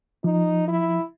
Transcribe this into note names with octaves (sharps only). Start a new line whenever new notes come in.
F3 D#4
E4